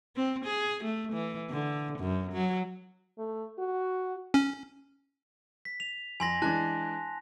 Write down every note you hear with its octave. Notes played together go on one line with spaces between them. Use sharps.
C4
G#4
A3
E3
D3
F#2
F#3
A3
F#4
C#4
B6
F7
F2 G#5 C6 A#6
E3 G#3 D4 A5 F#6